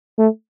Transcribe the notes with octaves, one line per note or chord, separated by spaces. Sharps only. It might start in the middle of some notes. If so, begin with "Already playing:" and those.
A3